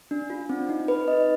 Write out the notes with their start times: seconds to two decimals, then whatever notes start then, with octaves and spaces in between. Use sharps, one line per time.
0.11 D4
0.30 F4
0.49 C4
0.69 D#4
0.88 B4
1.08 D#5